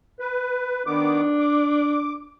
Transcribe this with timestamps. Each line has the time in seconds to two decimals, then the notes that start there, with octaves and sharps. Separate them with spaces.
0.20 B4
0.86 D#3 B3 D4 D6
1.40 D6